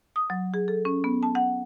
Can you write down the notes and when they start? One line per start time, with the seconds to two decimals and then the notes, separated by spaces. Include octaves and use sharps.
0.16 D#6
0.30 F#3
0.54 G#4
0.68 A4
0.85 C#4
1.04 B3
1.23 A5
1.35 F#5